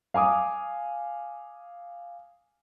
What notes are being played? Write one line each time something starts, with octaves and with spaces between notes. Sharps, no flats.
F5 G#5 D6 D#6